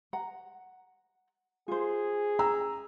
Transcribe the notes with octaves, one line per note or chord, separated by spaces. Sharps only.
F#5 A#5
F4 G#4 C5
A#5 E6